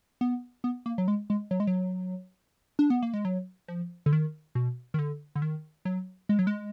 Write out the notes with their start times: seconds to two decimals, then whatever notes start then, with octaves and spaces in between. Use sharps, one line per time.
0.21 B3
0.64 B3
0.86 A#3
0.98 F#3
1.08 G#3
1.30 G#3
1.51 F#3
1.60 G#3
1.67 F#3
2.79 D4
2.90 B3
3.02 A#3
3.13 G#3
3.25 F#3
3.68 F3
4.06 D3
4.13 D#3
4.55 B2
4.94 D#3
4.99 D3
5.35 D3
5.42 D#3
5.85 F#3
6.29 G#3
6.39 F#3
6.47 G#3